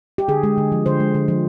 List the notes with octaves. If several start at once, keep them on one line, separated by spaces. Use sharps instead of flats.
G4
D3 G#4
G#3
D3
F3
D3 C5
G#3
D3
F3